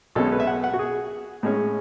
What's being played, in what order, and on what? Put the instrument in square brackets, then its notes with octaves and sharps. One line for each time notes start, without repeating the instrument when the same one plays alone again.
[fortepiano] B1 B2 G#3 C#4 A4
B4
E5
F#5
F#5
F#4
G#4
A2 G#3 C#4